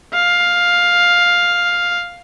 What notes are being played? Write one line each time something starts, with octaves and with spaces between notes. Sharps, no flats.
F5